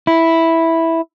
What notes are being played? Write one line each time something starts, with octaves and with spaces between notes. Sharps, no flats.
E4